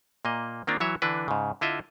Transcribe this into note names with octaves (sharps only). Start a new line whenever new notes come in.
A#2 A#3 D#5
D#3 A#3 C4 D4 F4
E3 F#3 C#5 E5
D3 E3 D4 B4
G#2 C#3
D3 E4 F4 D#5 E5